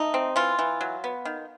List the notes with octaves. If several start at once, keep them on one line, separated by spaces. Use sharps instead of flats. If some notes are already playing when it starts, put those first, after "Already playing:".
Already playing: A3 D#4
C4
E3 F4
E3
F#3
B3
D#3